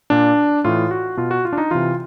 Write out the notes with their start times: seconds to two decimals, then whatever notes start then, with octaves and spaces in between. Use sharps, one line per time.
0.10 A#2 D4
0.64 A2 E3 F4
0.91 F#4
1.17 B2 F4
1.31 F#4
1.45 F4
1.53 D4
1.58 D#4
1.71 C3 E3 F4